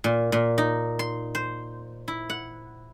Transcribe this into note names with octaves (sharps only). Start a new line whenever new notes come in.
A#2
A#2
D#4
C6
C5
E4
F#5